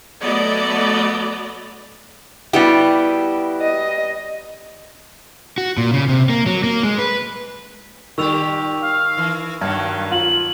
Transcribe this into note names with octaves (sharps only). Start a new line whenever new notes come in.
F#3 A3 B3 D5 D#5
G3 B3 E4 F#4 G4
D#5
F#4
A#2
C#3
C3
A#3
F#3
A#3
G#3
B4
A#2 D#3 G3 G4 C#6 E6 F7
F5
E3
G2 D#3 F#3 A#3 A5 C#6 G#6
F4 F#7